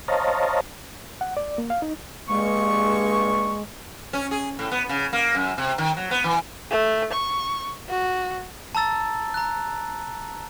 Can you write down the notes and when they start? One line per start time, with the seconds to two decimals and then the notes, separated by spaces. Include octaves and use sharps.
0.08 C5 C#5 D#5 F5 A5 A#5
1.21 F#5
1.37 D5
1.58 A#3
1.70 F5
1.82 D#4
2.29 G2 G#3 A#3 C#6
4.13 C#4
4.31 G#4
4.59 A2
4.71 B3
4.89 C#3
5.13 A#3
5.35 F#2
5.58 C3
5.78 D#3
5.97 F#3
6.11 B3
6.24 E3
6.71 A3
7.13 C#6
7.89 F#4
8.75 A5 A#5 E6 A6
9.34 A#5 F#6